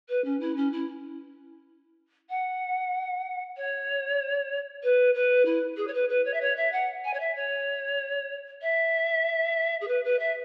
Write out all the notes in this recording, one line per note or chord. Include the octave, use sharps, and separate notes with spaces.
B4
C#4
E4
C#4
E4
F#5
C#5
B4
B4
E4
G#4
C#5
B4
B4
C#5
E5
C#5
E5
F#5
G#5
C#5
E5
C#5
E5
G#4
B4
B4
E5